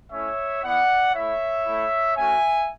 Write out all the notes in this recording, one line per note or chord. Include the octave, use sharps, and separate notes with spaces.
A3 C#4 E4 C#5 E5
B3 E4 D5 F#5
A3 E4 C#5 E5
A3 E4
A3 C#4 F#4 E5 G#5